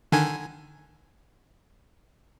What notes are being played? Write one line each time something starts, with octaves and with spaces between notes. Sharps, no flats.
D3 D#3 G#5